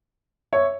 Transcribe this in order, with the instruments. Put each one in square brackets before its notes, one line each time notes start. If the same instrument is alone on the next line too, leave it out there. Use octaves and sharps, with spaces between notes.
[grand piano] C#5 E5